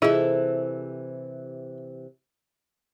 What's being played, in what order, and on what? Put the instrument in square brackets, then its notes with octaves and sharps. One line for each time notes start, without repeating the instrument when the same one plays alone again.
[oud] C3 E3 [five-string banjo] E4 A4 [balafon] F4 G#4 D#5